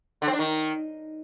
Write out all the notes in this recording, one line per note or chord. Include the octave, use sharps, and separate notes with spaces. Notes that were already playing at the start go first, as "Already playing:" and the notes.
D3
C4
D4
D#3